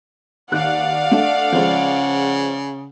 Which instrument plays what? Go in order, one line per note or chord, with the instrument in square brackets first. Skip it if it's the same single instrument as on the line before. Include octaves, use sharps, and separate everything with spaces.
[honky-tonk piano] D#2 F#6 [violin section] D5 F5 [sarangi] F#5
[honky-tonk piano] A3 D4
[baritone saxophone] C#3 [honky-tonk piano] F3 G#3